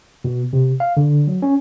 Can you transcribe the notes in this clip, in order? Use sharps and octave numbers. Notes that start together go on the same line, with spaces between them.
B2
C3
F5
D3
F#3
C#4